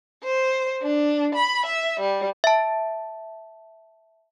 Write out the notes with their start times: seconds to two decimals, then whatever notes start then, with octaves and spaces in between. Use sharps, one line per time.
0.24 C5
0.82 D4
1.35 B5
1.66 E5
2.01 G3
2.44 E5 A5